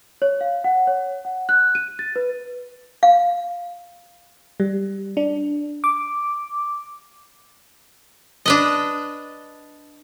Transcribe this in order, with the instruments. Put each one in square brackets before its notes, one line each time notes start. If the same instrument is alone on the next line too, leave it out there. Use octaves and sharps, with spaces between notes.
[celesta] C#5
F5
F#5
C#5
F#5
F#6
D#7
A6
B4
[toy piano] F5
[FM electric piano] G3
D4
D6
[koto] D4 B4 D#5